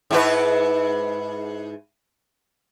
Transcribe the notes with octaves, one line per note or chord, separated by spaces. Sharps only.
G#2 E4 B4